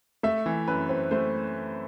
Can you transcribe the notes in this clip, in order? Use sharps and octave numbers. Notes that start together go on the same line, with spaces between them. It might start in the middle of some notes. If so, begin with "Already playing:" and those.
A3 E5
E3
F#2 B4
C4
A3 C5